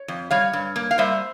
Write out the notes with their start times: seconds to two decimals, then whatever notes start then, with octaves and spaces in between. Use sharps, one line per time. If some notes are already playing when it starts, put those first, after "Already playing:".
Already playing: C#5
0.08 F2
0.31 G3 C#5 F5
0.53 G2
0.76 A#3
0.91 F5
0.98 G3 C5 E5